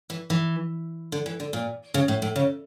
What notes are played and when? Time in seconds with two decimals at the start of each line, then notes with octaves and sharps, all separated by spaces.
0.10 E3
0.30 E3
1.12 D3
1.26 E3
1.40 D3
1.53 A#2
1.94 C#3
2.08 A2
2.22 A2
2.36 C#3